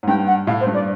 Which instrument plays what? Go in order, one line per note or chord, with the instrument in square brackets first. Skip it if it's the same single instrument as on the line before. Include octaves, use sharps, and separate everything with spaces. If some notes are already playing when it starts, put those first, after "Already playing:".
[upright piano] G#2
[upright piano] G2 [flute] G5
[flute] F#5
[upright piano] A2 [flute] F5
[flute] C5
[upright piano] G2
[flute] D5